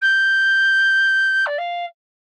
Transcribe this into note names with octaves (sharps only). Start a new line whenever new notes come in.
G6
D5
F5